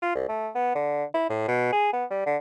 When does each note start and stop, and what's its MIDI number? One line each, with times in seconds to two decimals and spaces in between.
0.03 0.15 65
0.15 0.29 36
0.29 0.50 57
0.55 0.71 59
0.75 1.04 50
1.14 1.28 64
1.30 1.43 45
1.48 1.71 47
1.73 1.93 68
1.93 2.05 59
2.11 2.23 55
2.26 2.37 50